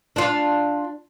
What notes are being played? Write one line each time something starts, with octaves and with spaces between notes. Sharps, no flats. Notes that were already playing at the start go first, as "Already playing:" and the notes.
D4 F4